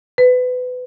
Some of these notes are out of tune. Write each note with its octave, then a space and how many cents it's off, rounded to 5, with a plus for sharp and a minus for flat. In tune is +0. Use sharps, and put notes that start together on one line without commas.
B4 +25